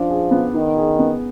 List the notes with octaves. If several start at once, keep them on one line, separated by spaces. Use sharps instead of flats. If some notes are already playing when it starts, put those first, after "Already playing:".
Already playing: F3 D4
G#4
B3
D#3 D#4
G#4
B3